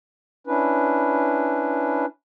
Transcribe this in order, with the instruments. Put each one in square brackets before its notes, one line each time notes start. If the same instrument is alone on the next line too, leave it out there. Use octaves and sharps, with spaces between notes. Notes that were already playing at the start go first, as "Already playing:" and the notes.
[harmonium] C#4 D4 E4 B4